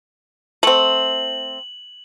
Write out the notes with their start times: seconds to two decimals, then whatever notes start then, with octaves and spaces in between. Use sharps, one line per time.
0.63 A3 C4 F#7